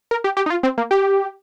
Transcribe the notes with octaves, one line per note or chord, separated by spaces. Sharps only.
A#4
G4
G4
D#4
F4
C4
A#3
G4